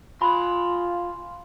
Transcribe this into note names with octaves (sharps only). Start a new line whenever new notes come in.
F4 G#5 B5 C6